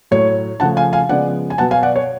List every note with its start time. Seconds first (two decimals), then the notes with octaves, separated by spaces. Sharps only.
0.11 A2 F#3 A3 C#5
0.60 C#3 F3 A3 F#5 A5
0.77 F5 G#5
0.93 F5 G#5
1.09 C#3 F3 G#3 B3 D5 F#5
1.50 G#5
1.58 B2 F#3 B3 F#5 A5
1.71 F5 G#5
1.83 D5 F#5
1.96 C#5